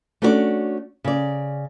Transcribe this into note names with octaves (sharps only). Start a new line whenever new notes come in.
A3 C#4 D4 F#4 B4 D5
C#3 D5